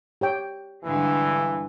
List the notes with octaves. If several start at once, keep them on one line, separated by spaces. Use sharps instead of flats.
G4 C#5 G5
G2 D3 E3 G#3